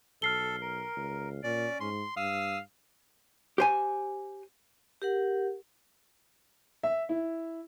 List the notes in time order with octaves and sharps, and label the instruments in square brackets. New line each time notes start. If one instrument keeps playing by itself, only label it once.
[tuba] B1 [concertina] A4 [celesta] F6 C7 G7
[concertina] A#4
[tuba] C#2
[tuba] A#2 [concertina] C#4 [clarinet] D5
[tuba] G#2 [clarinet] C6
[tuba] G2 [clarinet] F5 [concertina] D#6 E6
[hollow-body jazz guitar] G4 C5 G#5
[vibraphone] G4 A#4 F#5
[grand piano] E5
E4